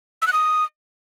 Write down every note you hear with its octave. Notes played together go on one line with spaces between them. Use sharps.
E6
F#6
D#6